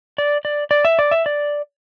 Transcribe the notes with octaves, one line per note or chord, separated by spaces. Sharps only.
D5
D5
D5
E5
D5
E5
D5